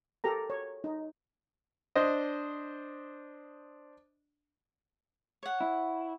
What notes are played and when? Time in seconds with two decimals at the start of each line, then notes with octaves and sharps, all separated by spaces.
0.24 G4 A4 A#4 A#5
0.50 C#5
0.84 D#4
1.95 D4 C5 D#5
5.43 C#5 F#5
5.61 E4